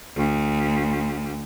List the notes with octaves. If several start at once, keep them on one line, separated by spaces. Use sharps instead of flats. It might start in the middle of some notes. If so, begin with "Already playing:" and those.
D2